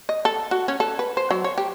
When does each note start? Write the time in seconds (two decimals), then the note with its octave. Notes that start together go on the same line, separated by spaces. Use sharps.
0.09 D#5
0.25 A4
0.51 F#4
0.68 C#4
0.80 A4
0.99 B4
1.17 C5
1.31 F#3
1.44 C#5
1.58 G4